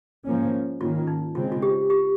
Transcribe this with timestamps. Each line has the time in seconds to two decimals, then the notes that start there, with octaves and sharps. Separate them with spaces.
0.25 G#2 F3 A#3 C#4
0.80 G#2 D#3 A#3 C#4 F4
1.07 D#4
1.35 C#3 G#3 C4 F4
1.52 F4
1.62 G4
1.90 G4